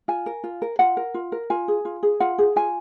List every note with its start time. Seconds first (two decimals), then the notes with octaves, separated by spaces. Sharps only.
0.08 F4 G#5
0.26 A#4
0.44 F4
0.62 A#4
0.79 F4 F#5
0.97 A#4
1.14 F4
1.32 A#4
1.50 F4 G#5
1.68 G#4
1.85 F4
2.03 G#4
2.20 F4 F#5
2.38 G#4
2.56 F4 G#5